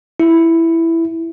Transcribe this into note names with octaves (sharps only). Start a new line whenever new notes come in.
E4